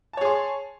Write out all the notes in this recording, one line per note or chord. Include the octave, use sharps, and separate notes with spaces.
G#4 C#5 A5 C6